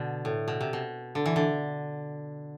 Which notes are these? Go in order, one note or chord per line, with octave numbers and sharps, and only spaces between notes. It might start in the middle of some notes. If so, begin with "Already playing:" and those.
Already playing: B2 D3
A2
B2
C3
B2
D3
E3
D3